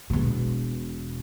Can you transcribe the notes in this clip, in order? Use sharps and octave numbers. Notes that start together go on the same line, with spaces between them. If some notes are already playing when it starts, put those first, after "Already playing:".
E1 B2